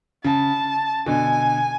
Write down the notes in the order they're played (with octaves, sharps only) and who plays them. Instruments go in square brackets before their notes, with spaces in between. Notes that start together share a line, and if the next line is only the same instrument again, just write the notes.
[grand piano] C#3 [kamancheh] A5
[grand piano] B2 D3 [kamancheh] G#5